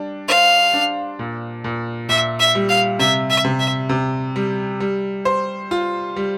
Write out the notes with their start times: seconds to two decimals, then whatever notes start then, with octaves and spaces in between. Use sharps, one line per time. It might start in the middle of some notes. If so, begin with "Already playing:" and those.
Already playing: G3 D4
0.28 C5 F5
0.74 D4
1.19 A#2
1.64 A#2
2.09 A#2 E5
2.40 E5
2.55 G3
2.69 F5
2.99 C3 E5
3.30 E5
3.44 C3
3.59 E5
3.89 C3
4.36 G3
4.80 G3
5.25 C5
5.71 F4
6.16 G3